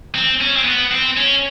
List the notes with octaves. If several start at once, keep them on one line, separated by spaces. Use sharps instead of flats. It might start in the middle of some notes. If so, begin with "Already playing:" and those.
C4
C#4
C4
B3
C4
C#4